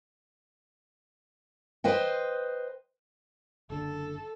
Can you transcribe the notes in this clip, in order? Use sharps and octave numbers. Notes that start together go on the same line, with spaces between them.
B4 C5 D#5 G5
F#1 D3 A4